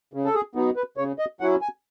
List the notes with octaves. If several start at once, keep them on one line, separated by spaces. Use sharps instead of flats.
C#3
A4
G#4
F#3 B3 D#4
B4
C#3 C#5
D#5
F#3 C#4 E4 F#5
G#5